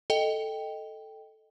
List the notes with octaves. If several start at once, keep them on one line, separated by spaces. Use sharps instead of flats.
A4 D#5 G5